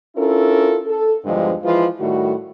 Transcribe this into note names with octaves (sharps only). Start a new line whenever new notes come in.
C#4 D4 E4 F4 A4 A#4
A4
E2 G2 D3 F3 G#3
E3 F3 G#3 F4
A2 D#3 G3 A3 F#4